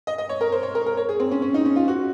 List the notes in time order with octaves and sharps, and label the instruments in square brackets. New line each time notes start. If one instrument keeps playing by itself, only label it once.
[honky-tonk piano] D#5
D#5
C#5
A#4
C5
C#5
A#4
A#4
C#5
G#4
C4
C#4
C#4
D#4
C#4
F4
F#4